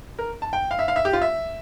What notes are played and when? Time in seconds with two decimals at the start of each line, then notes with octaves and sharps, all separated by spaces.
0.19 A#4
0.42 A5
0.53 G5
0.71 F5
0.79 E5
0.88 F5
0.96 E5
1.05 G4
1.13 F4
1.22 E5